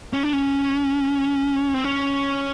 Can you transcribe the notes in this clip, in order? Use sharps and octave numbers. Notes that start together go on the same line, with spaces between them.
C#4
D4
C#4
C4
C#4